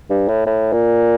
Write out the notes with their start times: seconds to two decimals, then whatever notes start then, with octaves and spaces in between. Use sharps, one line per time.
0.10 G2
0.28 A2
0.46 A2
0.73 A#2